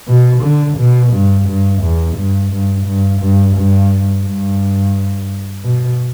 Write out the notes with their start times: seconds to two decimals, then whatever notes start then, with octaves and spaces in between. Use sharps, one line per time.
0.08 B2
0.43 D3
0.78 B2
1.13 G2
1.47 G2
1.82 E2
2.17 G2
2.51 G2
2.86 G2
3.21 G2
3.56 G2
4.25 G2
5.64 B2